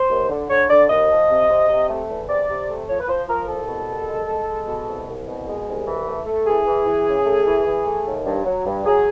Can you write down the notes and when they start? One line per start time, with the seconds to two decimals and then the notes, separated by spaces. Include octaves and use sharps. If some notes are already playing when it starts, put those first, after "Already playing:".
Already playing: C5
0.10 D#2
0.29 D3
0.49 D3 C#5
0.70 D3 D5
0.89 D#2 D#5
1.09 F3
1.29 C3
1.49 C3
1.69 C3
1.89 A3
2.08 E2
2.28 C3 D5
2.48 C3
2.68 A3
2.88 F3 C#5
2.99 B4
3.08 F3 C5
3.28 F3 A#4
3.48 C2 A4
3.68 B2
3.88 C2
4.08 G#3
4.27 G#3
4.47 G#3
4.67 B2
4.87 C2
5.07 C2
5.27 B2
5.46 G#3
5.67 C2
5.86 E3
6.07 A3
6.26 A3
6.46 E3 G#4
6.66 E3
6.86 E3
7.06 C#3
7.25 A3
7.45 E3
7.65 E3
7.86 A3
8.05 D#2
8.25 G2
8.45 F#3
8.65 G2
8.85 F#3 G#4